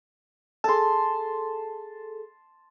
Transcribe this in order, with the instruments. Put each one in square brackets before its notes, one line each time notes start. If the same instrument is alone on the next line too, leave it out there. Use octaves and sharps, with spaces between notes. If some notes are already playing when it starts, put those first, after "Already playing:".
[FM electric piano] G#4 A4 [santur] A5 C6